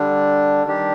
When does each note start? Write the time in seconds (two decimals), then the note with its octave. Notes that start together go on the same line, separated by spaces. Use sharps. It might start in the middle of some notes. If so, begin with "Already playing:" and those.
Already playing: D3 G3 D4
0.65 D#3 G3 D4 G4